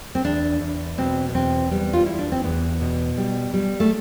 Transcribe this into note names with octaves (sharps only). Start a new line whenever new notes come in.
C4
E2 D4
E2
B2 C4
B3
E2 C4
G3 B3
F4
E2 E4
D4
C4
E2 B3
B2
G3
G3
A3